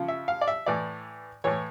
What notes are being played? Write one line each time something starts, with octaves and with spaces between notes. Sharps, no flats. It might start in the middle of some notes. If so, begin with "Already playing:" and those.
Already playing: C#3 F3
E5
F5
D5
E5
A2 E3 D5
A2 E3 C#5